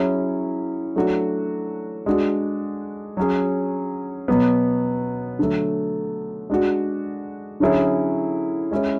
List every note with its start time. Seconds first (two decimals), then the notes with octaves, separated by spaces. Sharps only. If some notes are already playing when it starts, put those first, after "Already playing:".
Already playing: F#3 C#4 E4 G#4
0.96 F#3 A3 D4 F#4
2.06 G#3 D4 F#4
3.17 F#3 C#4 G#4
4.28 B2 F#3 B3
5.39 D3 F#3 A3
6.50 G#3 D4 F#4
7.60 D3 F#3 C#4 E4 G#4
8.71 G#3 C#4 E4